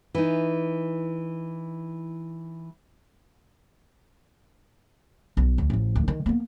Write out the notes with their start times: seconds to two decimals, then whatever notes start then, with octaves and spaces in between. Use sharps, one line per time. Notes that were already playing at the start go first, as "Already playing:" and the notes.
0.15 E3 D#4
5.37 B1
5.58 D2
5.70 A1 F3
5.95 D2
6.08 D#3
6.26 A#3 B3